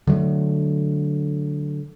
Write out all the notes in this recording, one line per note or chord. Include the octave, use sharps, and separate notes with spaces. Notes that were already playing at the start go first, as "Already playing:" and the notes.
D3 F#3 G#3 A3